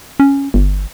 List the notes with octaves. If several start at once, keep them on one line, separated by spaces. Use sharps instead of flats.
C#4
G1